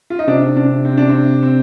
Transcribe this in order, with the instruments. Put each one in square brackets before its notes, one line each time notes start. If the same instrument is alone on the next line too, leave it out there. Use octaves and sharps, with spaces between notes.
[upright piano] F4
D#4
[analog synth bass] C3 [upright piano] D4
[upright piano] D4
C4
D4
C4
C4